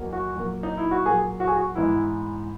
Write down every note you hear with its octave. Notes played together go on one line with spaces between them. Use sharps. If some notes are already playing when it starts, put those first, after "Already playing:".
Already playing: E2 B2 F#3 A#3
F#4
A#2 F#3 A#3
D#4
E4
F#4
A#2 F#3 A#3 G#4
F#4
G#4
F#4
G#2 E3 B3 E4